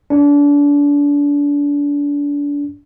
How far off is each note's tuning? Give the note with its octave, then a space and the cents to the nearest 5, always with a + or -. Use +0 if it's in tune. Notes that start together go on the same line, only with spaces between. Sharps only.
D4 -30